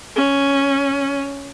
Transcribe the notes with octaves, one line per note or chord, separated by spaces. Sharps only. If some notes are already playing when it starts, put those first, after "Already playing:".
C#4